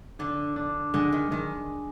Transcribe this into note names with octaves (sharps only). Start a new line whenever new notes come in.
D3 D4
D4
D3 G#3
D#3
D#3 G#3